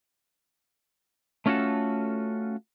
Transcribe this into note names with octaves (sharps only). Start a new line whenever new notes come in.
A3 C#4 F4 F#4 A4